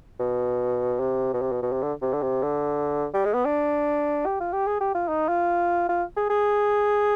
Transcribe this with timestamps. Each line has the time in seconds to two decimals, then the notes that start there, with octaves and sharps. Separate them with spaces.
0.19 B2
1.00 C3
1.33 B2
1.41 C3
1.52 B2
1.62 B2
1.72 C3
1.82 D3
2.02 C3
2.13 D3
2.22 C3
2.42 D3
3.14 G3
3.25 G#3
3.34 B3
3.45 D4
4.26 G4
4.40 F4
4.53 G4
4.67 G#4
4.80 G4
4.95 F4
5.08 D#4
5.28 F4
5.89 F4
6.17 G#4
6.30 G#4